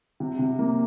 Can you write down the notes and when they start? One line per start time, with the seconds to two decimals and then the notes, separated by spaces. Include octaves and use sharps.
0.20 C3
0.39 C3
0.59 A#3